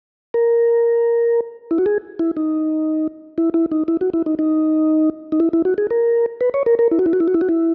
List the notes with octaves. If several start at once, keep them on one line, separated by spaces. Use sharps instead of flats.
A#4
E4
F#4
G#4
E4
D#4
E4
E4
D#4
E4
F#4
E4
D#4
D#4
D#4
E4
E4
F#4
G#4
A#4
B4
C#5
A#4
A#4
E4
F#4
E4
F#4
E4
F#4
E4
F#4
E4